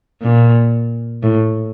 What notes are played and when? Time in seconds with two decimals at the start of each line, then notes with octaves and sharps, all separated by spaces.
0.23 A#2
1.23 A2